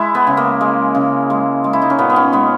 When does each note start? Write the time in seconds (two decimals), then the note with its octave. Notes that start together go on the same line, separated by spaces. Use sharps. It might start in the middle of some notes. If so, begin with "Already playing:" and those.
Already playing: G#3 E4
0.15 B3
0.27 C#3
0.37 A#3
0.61 G#3
0.95 C#3
1.30 G#3
1.64 G#3
1.73 E4
1.82 D#4
1.90 C#4
1.98 A#2 B3
2.09 B3
2.16 C#4
2.32 G#3 B3